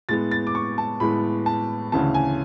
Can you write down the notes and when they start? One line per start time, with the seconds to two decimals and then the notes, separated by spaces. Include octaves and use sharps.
0.09 A2 G#3 B3 A6
0.31 A6
0.47 D6
0.55 C#6
0.78 A5
1.00 A2 G#3 B3 B5
1.46 A5
1.92 D2 C#3 E3 A5
2.14 G#5